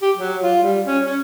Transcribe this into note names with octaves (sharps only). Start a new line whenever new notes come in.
G4
F#3
F4
G3
C#4
C#4